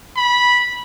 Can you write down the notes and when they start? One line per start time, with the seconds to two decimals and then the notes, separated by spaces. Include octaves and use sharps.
0.16 B5